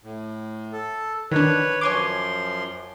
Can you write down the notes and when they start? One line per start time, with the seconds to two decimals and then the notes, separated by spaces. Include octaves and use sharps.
0.03 A2
0.73 A4
1.31 D#3 D4 B4 C#5
1.81 F#2 F3 C#5 G#5 C6 D6